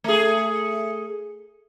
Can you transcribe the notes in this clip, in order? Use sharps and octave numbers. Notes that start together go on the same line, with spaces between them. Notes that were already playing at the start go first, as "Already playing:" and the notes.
A3 G#4